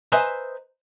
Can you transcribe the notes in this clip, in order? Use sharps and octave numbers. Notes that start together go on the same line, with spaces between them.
B4 C5 D#5 E5 G#5 A#5